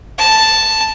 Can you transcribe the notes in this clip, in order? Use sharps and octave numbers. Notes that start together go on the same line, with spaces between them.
A5